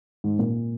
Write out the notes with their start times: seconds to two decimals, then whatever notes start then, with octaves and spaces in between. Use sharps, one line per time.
0.24 G#2
0.39 A#2